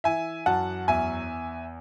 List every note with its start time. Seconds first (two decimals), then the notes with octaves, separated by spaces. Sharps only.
0.04 E3 E5 G#5
0.46 F#2 F#5 A5
0.88 E2 E5 G#5